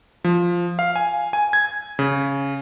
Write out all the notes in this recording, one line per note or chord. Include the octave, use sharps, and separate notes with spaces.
F3
F5
G#5
G#5
G#6
C#3